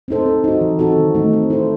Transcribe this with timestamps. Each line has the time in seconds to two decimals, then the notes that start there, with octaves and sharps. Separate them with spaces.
0.08 C4 D#4 A4 C5
0.26 C4
0.44 D#4 F#4
0.61 E3
0.79 C4 D#4 F#4 A4
0.96 D#3
1.15 A3 D#4
1.33 C4
1.50 E4 A4 C5